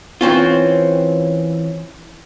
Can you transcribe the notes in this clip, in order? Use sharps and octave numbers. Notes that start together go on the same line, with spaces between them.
E3 C4 C#4 F4